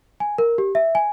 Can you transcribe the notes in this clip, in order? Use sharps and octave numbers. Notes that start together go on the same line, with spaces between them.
G#5
A#4
G4
E5
G#5